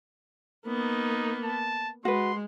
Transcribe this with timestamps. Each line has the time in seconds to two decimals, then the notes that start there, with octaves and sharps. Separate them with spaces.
0.66 A#3 B3 D#4
1.44 A5
2.05 G#3 F#4 B4 C6